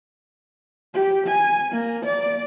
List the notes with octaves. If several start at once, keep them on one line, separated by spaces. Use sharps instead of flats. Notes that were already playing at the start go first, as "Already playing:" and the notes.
G4
G#5
A#3
D5